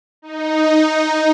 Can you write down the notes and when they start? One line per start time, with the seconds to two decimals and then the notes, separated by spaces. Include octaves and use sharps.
0.22 D#4